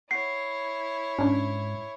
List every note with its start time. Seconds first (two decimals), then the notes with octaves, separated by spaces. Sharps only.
0.11 E4 C#5 F#5 C7
1.19 G#2 C#4 D4